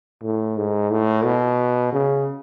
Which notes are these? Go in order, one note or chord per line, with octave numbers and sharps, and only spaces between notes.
A2
G#2
A2
B2
C#3